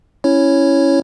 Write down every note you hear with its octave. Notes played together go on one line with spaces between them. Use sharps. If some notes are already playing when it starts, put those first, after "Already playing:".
C#4 E4 C#5